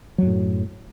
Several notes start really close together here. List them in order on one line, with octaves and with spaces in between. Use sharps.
F#3 F#2 A2